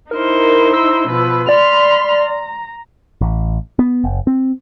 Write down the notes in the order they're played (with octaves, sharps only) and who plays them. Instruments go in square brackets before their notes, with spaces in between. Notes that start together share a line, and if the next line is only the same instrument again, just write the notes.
[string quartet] D#4 E4 C5 [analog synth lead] A#4
[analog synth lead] E6
[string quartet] B2 F3 B4
[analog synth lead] D5 [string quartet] B5 C6 F6
[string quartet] A#5
[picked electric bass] A1
B3
F#1
C4